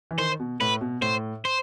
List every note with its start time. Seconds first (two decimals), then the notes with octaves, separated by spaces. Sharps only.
0.11 E3
0.18 D#3 C5
0.40 B2
0.61 A2 B4
0.81 B2
1.02 A2 C5
1.45 C5